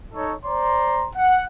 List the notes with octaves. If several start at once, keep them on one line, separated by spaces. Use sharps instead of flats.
D#4 A4 C#5
C5 D5 A#5 C6
F#5